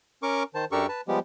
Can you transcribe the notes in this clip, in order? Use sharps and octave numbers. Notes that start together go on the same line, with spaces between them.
C#4 A#4 C#6 D6
D#3 C5 A5
F#2 D4 G4 A4 A#4 C#6
B4 A5
F3 G3 G#3 B3 G4